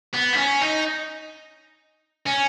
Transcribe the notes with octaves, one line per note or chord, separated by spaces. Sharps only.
B3
D#4
C#4
D#4
C#4